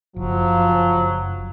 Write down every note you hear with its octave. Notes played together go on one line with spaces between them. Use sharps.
F#1 F3 F#3